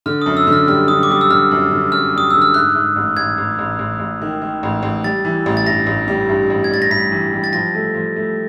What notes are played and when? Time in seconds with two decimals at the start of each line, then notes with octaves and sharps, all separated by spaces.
0.06 D3 F6
0.22 F#2 D#6
0.37 E6
0.47 D3
0.52 F6
0.67 G3 F6
0.88 D3 D#6
1.03 D6
1.10 G3 D#6
1.21 E6
1.30 D3 F6
1.51 F#2
1.72 D3
1.92 F#2 F6
2.14 G3 D#6
2.30 D3 E6
2.42 F6
2.54 G#2 F#6
2.75 G#2
2.96 A1
3.17 A1 G#6
3.38 A1
3.59 A1
3.79 A1
4.00 A1
4.22 D#3
4.42 D#3
4.63 A1
4.83 A1
5.04 G3 A6
5.25 E3
5.46 A1
5.57 A6
5.67 G2 A#6
5.87 A1
6.08 G3
6.29 G2
6.50 A1
6.64 G#6
6.70 G3 A6
6.82 A#6
6.91 G2 B6
7.11 E3
7.33 G3
7.44 A6
7.53 F3 A#6
7.75 A3
7.95 F3
8.16 A3